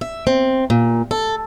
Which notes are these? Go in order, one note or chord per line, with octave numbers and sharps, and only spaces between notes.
E5
C4
A#2
A4